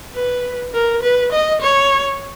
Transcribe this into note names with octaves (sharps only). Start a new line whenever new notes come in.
B4
A#4
B4
D#5
C#5